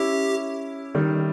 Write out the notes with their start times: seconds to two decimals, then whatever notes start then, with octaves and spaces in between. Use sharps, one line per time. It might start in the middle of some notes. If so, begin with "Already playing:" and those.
Already playing: C#4 E4 G4
0.95 D#3 G3